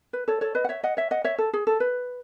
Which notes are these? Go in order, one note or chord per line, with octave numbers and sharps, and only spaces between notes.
B4
A4 C#5
A4 C#5
B4 D#5
F#5
C#5 E5
D#5 F#5
C#5 E5
D#5 F#5
C#5 E5
A4
G#4
A4
B4